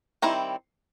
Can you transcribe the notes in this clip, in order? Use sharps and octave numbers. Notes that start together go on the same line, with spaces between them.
D#3 G3 C4 E4 A#5